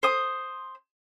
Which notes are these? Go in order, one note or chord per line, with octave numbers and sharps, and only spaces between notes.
C5 D#6